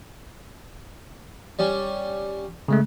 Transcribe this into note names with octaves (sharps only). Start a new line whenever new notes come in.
G3 C#4
C#3 G#3 A3